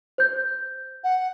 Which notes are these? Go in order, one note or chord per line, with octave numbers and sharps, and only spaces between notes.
C5 G6
F#5